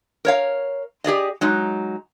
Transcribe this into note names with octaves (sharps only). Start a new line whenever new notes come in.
A#4 C#5 F5
G4 G#4 D5 D#5
F#3 G#3 D#4